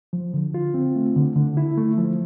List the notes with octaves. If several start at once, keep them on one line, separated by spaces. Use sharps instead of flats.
F3
D3
F4
C4
A3
D3
D3
E4
A3
F3